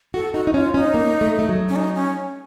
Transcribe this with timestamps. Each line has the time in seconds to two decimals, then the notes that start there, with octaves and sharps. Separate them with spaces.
0.14 F#4 A4
0.34 D#4 F#4
0.47 D#4
0.54 C#4 F4
0.74 C#4 D#4
0.94 A#3
1.21 A3
1.39 A3
1.49 F#3
1.69 C#4
1.76 D#4
1.95 C#4